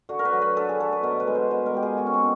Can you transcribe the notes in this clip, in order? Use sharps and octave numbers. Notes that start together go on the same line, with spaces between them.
D3 F#4
A#4
B4
F#3
B4
D3 A4
G#4
F#3 A4
B4
B2 A#4
B4
G#3
C5
B2 B4
A#4
G#3 G4
G#4
B2 F#4
C#4
C4